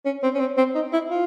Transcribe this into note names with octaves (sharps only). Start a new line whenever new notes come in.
C#4
C4
C#4
C4
C4
D#4
E4
F4